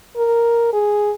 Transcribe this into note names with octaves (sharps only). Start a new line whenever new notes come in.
A#4
G#4